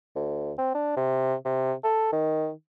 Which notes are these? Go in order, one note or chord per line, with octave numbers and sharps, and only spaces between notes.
D2
C4
D4
C3
C3
A4
D#3